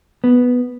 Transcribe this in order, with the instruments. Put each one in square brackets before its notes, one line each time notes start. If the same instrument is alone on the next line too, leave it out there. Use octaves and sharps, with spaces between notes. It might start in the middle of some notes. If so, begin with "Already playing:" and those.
[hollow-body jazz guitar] B3